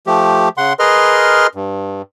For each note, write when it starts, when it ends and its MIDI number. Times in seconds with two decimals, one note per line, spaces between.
0.07 0.49 53
0.07 0.49 57
0.07 0.49 67
0.57 0.73 49
0.57 0.73 78
0.57 0.73 84
0.79 1.47 68
0.79 1.47 70
0.79 1.47 71
0.79 1.47 75
0.79 1.47 84
0.79 1.47 89
1.55 2.02 43